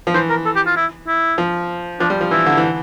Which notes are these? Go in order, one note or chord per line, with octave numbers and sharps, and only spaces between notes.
F3
E3 C5
A#4
A4
G4
F4
E4
E4
F3
F3 D4
G3
F3
E3 E4
D3
E3